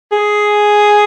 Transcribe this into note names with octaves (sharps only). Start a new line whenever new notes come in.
G#4